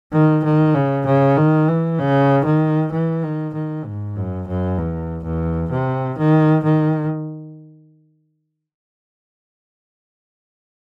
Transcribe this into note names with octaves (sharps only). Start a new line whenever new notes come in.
D#3
D#3
C#3
C#3
D#3
E3
C#3
D#3
E3
D#3
D#3
G#2
F#2
F#2
E2
E2
C3
D#3
D#3